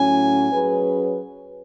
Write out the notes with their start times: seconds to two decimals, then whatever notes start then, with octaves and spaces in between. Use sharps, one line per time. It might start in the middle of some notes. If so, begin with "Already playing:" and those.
Already playing: A2 F#3 C#4 G#5
0.52 F#3 C#4 G#4 B4